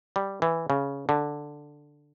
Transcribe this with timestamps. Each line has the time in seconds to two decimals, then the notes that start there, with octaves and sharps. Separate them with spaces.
0.16 G3
0.42 E3
0.70 C#3
1.09 D3